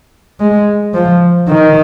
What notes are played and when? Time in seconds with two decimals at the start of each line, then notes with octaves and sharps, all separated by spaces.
0.40 G#3
0.94 F3
1.49 D#3